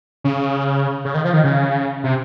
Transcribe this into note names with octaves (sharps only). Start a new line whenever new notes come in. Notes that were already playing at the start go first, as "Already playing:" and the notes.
C#3
C#3
D#3
F3
D#3
C#3
C3